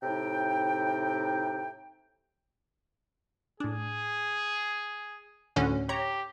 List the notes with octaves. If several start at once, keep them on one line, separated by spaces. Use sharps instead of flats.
A2 C3 D#4 G5
A2 D4 G#4
D2 A2 D3 C#4 F#4
G4 C#5 A#5